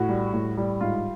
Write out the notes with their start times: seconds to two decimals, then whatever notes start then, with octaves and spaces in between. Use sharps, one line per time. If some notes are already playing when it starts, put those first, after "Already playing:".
Already playing: A2 F#4
0.09 G3
0.33 A2
0.57 G3
0.81 G#2 F4